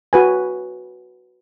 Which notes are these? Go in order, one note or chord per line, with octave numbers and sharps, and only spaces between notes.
F#4 B4 G#5